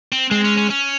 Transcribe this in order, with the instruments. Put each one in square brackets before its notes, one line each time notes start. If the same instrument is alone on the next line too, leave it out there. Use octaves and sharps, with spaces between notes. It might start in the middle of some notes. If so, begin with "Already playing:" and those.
[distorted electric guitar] C4
[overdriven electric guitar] G#3 [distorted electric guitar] C4
[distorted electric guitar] C#4
C#4
C#4